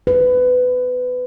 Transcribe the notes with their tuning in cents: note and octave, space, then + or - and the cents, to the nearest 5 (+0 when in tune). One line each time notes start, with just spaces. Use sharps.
B4 +20